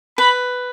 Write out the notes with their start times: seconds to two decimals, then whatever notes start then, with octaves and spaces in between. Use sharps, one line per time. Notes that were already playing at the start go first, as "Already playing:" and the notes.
0.18 B4 B5